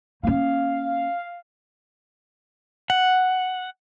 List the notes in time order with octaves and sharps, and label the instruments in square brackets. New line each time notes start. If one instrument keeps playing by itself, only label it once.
[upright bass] A#3 C#4 [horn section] F5
[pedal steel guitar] F#5